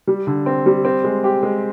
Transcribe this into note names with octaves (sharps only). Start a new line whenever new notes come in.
G3
D3
C4
G3
C4
G#3
G4
G#3